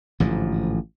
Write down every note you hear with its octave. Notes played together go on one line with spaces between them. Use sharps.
A1 G#2 D3 F3